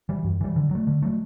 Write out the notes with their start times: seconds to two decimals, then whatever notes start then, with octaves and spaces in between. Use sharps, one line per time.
0.09 E3 G3
0.24 F#2
0.41 E3 G3
0.56 D3
0.71 F#3 A3
0.87 D3
1.02 F#3 A3